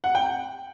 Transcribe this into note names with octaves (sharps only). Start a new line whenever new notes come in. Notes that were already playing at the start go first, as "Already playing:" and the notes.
F#5
G5